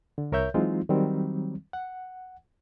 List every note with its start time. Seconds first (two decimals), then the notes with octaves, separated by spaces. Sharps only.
0.18 D3
0.32 C2 A#4 C#5 E5 G6
0.54 E3 F#3 G#3 C4 D#4 F4
0.89 D#3 F#3 G3 C4
1.73 F#5